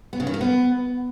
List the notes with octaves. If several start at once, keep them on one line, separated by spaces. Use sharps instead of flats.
B3
C#3
D#3
A#3
B3